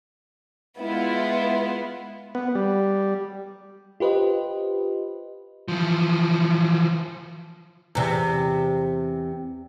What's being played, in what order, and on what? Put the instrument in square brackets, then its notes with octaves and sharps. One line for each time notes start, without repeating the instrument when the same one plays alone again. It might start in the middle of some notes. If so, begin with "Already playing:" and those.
[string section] G#3 E4 F4 [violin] B3
[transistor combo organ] B3
G3
[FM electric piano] F4 G4 B4 C5 D#5
[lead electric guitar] E3 F3
[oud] E2 C3